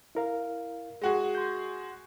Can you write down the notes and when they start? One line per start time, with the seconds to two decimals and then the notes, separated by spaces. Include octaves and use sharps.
0.15 E4 A#4 F5
1.01 G#3 F#4 G#4
1.35 C6 G6